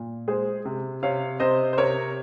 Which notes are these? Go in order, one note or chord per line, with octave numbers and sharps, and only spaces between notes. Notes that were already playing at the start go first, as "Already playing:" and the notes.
Already playing: A#2
G#3 G#4 C5
C3
C3 C#5 F5
C3 C5 D#5
C5
C3 A#4 C#5